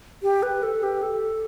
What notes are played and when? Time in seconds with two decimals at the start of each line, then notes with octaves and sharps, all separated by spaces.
0.23 G4
0.43 B4
0.63 A4
0.83 G4
1.02 A4